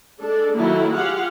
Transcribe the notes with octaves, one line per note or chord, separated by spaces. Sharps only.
G#3 D4 A4
D#3 F#3 A3 A#3 E4
F4 G4 G#4 F5 F#5